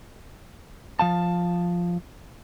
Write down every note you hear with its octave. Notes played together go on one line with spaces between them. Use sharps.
F3 F5 A5